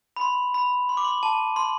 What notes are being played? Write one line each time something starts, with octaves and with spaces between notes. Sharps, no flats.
B5
C6
B5
C6
D6
C6
A5
C6